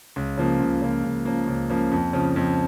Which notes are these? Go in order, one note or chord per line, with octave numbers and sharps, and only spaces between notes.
C#2
C#3 F3 A#3
C#2
C#3 F3 A#3
C#2
C#3 F3 A#3
C#2
C#3 F3 A#3
F2
C#3 F3
F2